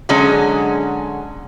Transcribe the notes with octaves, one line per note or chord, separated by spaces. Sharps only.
D3 F#3 G#3 C#4